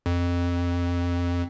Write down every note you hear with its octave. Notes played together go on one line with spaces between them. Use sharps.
F2